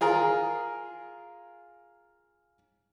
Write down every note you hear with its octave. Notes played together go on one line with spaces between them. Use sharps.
F4 G#4 A#4